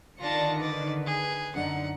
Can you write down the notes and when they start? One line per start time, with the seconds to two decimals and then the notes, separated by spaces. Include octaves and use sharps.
0.19 D3 D#3 D4 F4 A5 A#6 C#7
0.60 B4 D5
1.07 G#4
1.55 F#2 D3 D#4 F#5